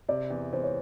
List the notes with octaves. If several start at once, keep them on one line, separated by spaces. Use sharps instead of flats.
C3 D5
E2
E2 C5
C#5